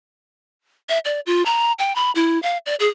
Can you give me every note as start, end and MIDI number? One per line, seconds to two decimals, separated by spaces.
0.89 0.99 76
1.05 1.20 74
1.26 1.43 65
1.46 1.72 82
1.79 1.95 79
1.95 2.11 83
2.15 2.41 64
2.43 2.58 77
2.66 2.75 74
2.80 2.88 68